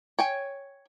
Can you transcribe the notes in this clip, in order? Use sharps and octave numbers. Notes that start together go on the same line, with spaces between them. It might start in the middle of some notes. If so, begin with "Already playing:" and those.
C#5 G5 G#5